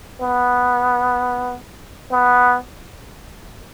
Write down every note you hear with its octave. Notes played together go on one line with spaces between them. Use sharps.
B3
B3